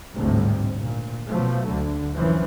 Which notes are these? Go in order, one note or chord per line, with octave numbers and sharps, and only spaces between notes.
G#1 D2 A2 C3 G3
A#2
B2 F3 F#3 A3
D2 D3
F#2 E3 F3